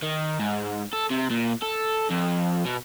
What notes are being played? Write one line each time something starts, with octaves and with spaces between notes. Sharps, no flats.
D#3
G#2
A4
C3
A#2
A4
F2
B2